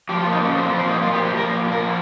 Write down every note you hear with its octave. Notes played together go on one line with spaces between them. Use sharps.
F3 G4
F4
A#2
D#4
A#2 C#4
F3 C4
C4
F3
C4
A#2 D#4
A#2 F4
G4
F3
G4
F3 A#4
A#2
A#2
A#4
F3